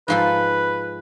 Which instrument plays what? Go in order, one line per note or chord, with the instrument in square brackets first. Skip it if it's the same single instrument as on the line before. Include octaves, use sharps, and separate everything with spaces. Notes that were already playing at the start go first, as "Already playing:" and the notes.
[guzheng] G#2 F3 A4 [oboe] B4